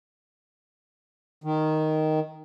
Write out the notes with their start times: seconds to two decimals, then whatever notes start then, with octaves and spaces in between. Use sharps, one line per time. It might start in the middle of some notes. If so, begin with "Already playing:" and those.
1.44 D#3